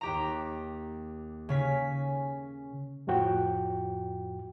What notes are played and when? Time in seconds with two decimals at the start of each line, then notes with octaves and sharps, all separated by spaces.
0.01 D#2 G4 A#5
1.49 C#3 C#4 B6
3.07 F2 A2 F3 F#4 G5